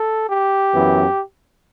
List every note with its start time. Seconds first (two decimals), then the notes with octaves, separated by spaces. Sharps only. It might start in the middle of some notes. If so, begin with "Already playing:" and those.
Already playing: A4
0.29 G4
0.74 F#2 E3 B3